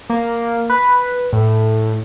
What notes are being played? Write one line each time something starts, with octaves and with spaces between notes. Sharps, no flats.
A#3
B4
A2